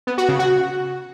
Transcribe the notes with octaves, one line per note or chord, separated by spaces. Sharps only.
B3
F#4
C#3
F#4